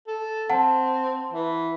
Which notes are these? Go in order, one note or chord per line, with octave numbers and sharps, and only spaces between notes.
A4
C4 F#5 A5
E3